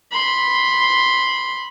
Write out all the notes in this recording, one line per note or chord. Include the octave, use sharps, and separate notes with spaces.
B5 C6